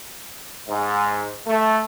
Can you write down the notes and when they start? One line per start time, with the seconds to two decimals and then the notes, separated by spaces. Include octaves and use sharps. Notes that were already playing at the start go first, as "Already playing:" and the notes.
0.68 G#2
1.46 A3